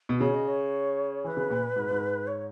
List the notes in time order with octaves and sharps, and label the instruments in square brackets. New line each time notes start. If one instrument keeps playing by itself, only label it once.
[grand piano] B2
[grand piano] C#3 [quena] C#5
[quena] D#5
C#5
[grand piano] E3 [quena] B4 C#5
[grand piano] C#3
A#2
G#2
G#2
[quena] C#5